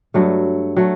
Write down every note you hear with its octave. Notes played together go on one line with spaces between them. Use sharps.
G2 F#3 A3
F#3 A3